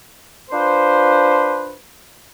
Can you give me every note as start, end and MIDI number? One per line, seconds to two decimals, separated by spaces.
0.50 1.75 62
0.50 1.75 65
0.50 1.75 71
0.50 1.75 72